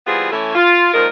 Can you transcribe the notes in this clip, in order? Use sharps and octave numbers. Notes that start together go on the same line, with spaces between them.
E3 G3 B3 C4 F4 G#4
E3 A3 C#4
F4
A#2 D#3 F3 G#3 F4 A#4